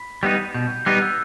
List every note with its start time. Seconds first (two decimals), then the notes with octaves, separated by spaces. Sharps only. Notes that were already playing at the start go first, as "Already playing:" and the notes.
Already playing: B5 B6
0.23 G3 B3 D#4
0.54 B2 G6
0.70 G6
0.86 G3 B3 D#4 F#6
1.02 E6